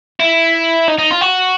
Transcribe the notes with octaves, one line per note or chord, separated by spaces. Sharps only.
E4
D#4
D#4
F4
F#4